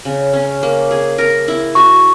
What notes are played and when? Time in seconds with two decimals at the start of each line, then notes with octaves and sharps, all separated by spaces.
0.05 C#3
0.33 C#4
0.63 A#3
0.91 G#4
1.18 A#4
1.48 E4
1.75 F#4 C#6